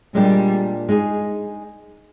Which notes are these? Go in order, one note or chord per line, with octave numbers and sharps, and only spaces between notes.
A#2 G3 G#3 D4 G4
G#3 D#4 G#4